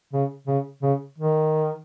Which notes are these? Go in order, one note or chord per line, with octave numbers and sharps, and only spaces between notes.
C#3
C#3
C#3
D#3